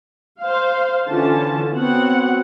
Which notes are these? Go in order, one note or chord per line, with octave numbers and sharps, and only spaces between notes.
C5 F5
D3 E3 C#4 F4 A5
B3 C4 F#4 C#5 F#5